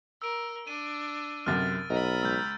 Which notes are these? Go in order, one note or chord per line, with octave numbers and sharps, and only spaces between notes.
A#4 E6 D7
D4 D#7
B1 F#2 C3 F6 A6
B1 D#5 F#5 A#5 B5
C#2 E6 G6